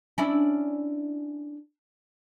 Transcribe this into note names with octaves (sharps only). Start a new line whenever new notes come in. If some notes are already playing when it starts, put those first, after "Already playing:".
C#4 D4 E4